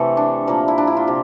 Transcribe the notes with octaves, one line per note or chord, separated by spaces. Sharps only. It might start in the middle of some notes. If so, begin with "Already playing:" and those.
Already playing: C3 E3 A3 G4 A4
D4
A#2 F3 A#3
E4
D4
E4
F4
C3 G4